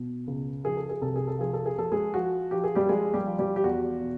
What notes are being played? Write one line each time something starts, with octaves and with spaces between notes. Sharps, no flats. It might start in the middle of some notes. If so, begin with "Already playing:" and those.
Already playing: B2
C#2
F3 G#4
A4
G#4
C2 A4
G#4
A4
F3 G#4
A4
G#4
F3 A4
G#3 G#4
F3 F#4
F3 G4
G#4
G3 G4
F3 G#3 G#4
G3 G4
F3
G3 G4
G4
E2 F#4
B2